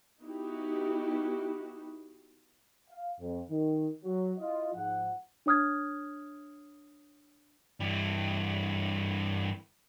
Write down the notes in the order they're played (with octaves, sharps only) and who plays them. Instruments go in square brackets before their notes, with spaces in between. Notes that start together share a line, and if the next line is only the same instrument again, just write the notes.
[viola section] B3 D#4 E4 F#4 G4
[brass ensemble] F5
F2
D#3
F#3
E4 F4 D#5
G#2 F3 F#5
[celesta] D4 C#5 D#6 F6 G#6
[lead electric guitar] G2 E3